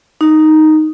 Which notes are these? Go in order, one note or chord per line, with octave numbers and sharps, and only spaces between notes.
D#4